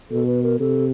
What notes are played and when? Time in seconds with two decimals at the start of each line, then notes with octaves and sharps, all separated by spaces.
0.11 B2 A4
0.26 B4
0.43 A#4
0.60 C3 A4